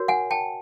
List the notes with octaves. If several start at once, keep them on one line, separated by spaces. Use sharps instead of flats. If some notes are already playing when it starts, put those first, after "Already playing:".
Already playing: F#4 A#4 C#5
F#5 G#5
G5 A5